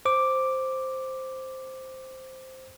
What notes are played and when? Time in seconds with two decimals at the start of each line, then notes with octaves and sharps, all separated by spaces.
0.05 C5 D6